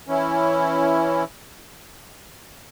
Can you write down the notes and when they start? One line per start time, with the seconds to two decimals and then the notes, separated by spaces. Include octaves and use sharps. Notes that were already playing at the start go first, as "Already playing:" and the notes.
0.07 E3 C#4 E4